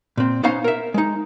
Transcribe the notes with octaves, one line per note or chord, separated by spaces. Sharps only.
A#2 C4
B3 C#4 D#4 C5 F5 A#5
A#4 E5
G#3 D#4